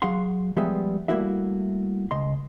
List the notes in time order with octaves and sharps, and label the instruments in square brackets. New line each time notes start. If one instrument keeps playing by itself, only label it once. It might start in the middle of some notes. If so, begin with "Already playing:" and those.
[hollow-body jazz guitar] F#3 F#4 G#4 F5 F#5 C6
F3 G3 G#3 B3 G#4 E5
G3 A3 A#3 E4 F#4 E5
C#2 D#5 C6